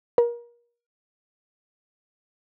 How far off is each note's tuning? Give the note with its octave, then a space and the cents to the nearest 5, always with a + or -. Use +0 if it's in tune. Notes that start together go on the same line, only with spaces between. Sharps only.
A#4 +30